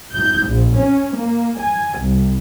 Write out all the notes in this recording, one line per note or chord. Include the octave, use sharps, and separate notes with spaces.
G6
A#1
C#4
A#3
G#5
C2